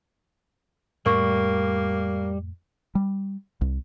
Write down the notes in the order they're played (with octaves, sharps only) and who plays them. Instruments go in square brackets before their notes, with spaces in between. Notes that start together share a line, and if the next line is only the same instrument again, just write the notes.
[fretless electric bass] F2 A2 A3 [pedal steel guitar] G3 [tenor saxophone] A#3 [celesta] A#4 C#6
[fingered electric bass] G3
C2